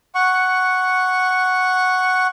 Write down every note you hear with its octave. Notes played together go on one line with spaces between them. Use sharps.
F#5 C#6